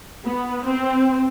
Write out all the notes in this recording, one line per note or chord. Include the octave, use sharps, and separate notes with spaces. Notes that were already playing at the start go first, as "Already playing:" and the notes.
B3
C4